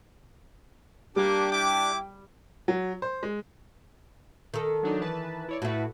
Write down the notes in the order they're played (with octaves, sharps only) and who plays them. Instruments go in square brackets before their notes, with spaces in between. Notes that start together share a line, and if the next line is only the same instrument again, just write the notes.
[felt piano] G3 [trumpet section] A#3 D6 [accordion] D4 G4
[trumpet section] E4 D6 [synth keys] G5
[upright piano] F#3
C5
G#3
[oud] D#3 A4
[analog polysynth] F#3 D4 D#4
E3 B4 A5
E4 C#5 D5
[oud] A2 E4 [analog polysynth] F#4 A4 B4